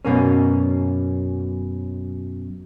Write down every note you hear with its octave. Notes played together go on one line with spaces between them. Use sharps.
F#2 B2 A#3 C#4